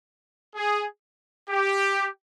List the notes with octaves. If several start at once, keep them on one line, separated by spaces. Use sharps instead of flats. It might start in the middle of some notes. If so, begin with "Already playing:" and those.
G#4
G4